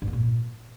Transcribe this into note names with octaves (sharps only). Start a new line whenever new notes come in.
G2
A#3
A#2